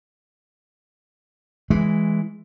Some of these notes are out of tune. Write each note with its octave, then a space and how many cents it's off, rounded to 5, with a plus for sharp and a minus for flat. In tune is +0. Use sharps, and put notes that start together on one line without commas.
E3 +0 G#3 +0